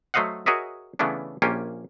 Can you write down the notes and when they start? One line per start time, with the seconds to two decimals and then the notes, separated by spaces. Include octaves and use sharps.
0.14 F#3 A3 C5 D#5 F5 F#5
0.46 F#4 G#4 A#4 C#5 D#5 E5
0.99 C#3 E3 A3 B3 C#4 D4
1.42 A#1 A#3 C#4 F4 G4 G#5